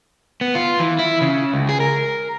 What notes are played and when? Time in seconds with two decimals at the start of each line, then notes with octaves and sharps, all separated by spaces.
0.41 B3
0.55 F4
0.79 E3
0.99 E4
1.21 C#3
1.54 C#2
1.69 G#4
1.80 A#4